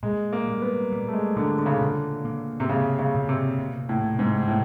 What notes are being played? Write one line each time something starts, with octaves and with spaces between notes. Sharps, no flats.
A#2 G#3
A#3
G3
B3
G3
A3
G#3
A#2 D3
D3
C#3
D3
A#2
A#3
C3
C#3 A#3
C#3
A#2
C3
C3
A2
C3
G#2
A2 C3